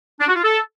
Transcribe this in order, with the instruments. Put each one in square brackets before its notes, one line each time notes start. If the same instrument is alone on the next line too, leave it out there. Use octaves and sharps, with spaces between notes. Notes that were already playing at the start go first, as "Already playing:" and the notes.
[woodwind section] D4
F#4
F4
A4